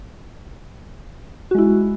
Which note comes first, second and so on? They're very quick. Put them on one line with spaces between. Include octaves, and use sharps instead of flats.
F#4 G#3 E4